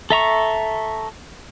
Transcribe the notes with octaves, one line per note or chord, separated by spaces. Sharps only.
A4 E5 A#5 C#6